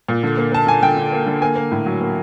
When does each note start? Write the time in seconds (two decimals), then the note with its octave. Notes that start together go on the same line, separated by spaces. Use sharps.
0.09 A#2
0.23 D3
0.37 A#3
0.52 A#3 A5
0.67 D3 G#5
0.83 D3 G5
0.97 D3
1.12 A#3
1.26 D3
1.42 A#3 G#5
1.56 A#3
1.72 A2
1.86 F#3
2.01 A#3